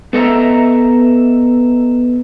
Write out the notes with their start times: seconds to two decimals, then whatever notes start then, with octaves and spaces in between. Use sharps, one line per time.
0.13 B3 A4 D#5 E5 A#5